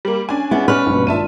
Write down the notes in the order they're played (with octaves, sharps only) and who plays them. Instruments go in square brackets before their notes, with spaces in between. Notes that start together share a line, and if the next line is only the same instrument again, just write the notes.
[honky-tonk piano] G3 A#3
[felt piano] C#4 [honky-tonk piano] D4 G#5
[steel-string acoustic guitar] B3 E4 [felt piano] C#4 G#4
[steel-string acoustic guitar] C#4 B4 [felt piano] F6
[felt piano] A#1 G2 B2
[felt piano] G#1 D4 F4 [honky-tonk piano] E5 A5 D#7